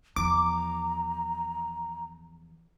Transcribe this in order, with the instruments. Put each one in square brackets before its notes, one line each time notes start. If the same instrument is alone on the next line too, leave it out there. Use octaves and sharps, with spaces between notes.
[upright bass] E2 F3 [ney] A#5 [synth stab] D6